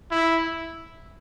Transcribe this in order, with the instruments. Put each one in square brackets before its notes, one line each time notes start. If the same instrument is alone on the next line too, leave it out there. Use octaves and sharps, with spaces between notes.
[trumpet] E4